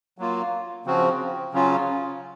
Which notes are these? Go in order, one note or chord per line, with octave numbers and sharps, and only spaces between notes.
F#3 A#3 F4
C#3 F3 C4 F#4
C#3 F#3 C#4 F4